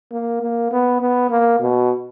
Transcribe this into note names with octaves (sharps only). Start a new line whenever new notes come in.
A#3
A#3
B3
B3
A#3
B2